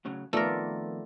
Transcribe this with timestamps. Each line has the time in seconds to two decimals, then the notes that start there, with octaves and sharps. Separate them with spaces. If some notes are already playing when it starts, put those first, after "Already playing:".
0.05 A2 C#3 F#3
0.33 F2 D#3 A3 B3 F4 A#4 D5